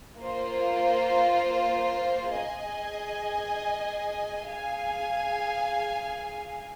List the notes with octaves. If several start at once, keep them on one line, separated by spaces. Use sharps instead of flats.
A#3 F4 C5
G#4 D#5 G#5
G#4 F5 G#5